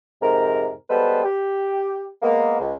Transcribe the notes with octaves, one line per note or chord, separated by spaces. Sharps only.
F2 G#2 C3 A#4
G3 G#3 B3 A4 B4 C5
G4
G#3 A#3 B3
C#2